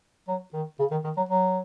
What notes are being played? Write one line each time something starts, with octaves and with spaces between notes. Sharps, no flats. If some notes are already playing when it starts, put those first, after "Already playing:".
F#3
D#3
C#3
D#3
D#3
F#3
F#3